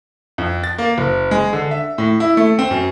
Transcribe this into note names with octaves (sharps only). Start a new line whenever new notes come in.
F2
A6
A#3
F#1
G#3
D3
E5
A2
E4
A3
C4
F#2